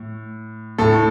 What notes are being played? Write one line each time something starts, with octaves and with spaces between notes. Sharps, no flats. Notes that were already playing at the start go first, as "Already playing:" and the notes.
Already playing: A2
A2 A4